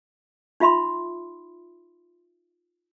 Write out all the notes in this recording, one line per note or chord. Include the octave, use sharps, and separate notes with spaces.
D#4 F4 E5 B5 C6